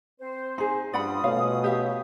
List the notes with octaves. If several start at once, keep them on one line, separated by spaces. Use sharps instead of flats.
C4 C5
D#4 G#4 C6
G2 F3 C#4 D5 F#5 B5 D#6
B2 A3 B4 C#5 F5
G4 E5 F5